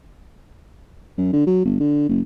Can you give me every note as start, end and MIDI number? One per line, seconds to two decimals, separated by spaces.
1.18 1.33 42
1.33 1.45 50
1.47 1.65 54
1.66 1.78 31
1.80 2.07 50
2.09 2.20 30